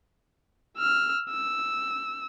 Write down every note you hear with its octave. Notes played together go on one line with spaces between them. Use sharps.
E6 F6
E6